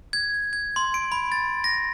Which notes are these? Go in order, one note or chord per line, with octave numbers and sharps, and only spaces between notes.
G#6
G#6
C6
D7
B5
A6
A#6